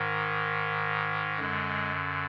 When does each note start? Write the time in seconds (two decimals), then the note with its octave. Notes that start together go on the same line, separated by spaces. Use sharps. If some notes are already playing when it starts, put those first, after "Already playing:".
Already playing: G#2 D#3
1.39 F#2 D3 G#3